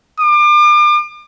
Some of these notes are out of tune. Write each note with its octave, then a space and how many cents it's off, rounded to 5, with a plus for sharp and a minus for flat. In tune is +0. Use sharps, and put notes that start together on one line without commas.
D6 +35